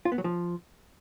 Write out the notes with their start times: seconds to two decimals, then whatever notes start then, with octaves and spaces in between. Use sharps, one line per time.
0.05 F4
0.12 B3
0.18 F#3
0.24 F3